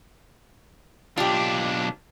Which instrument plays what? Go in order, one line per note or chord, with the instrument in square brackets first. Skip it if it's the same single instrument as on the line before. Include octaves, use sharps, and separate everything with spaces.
[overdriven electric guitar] B1 D4 [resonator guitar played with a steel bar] F4 G4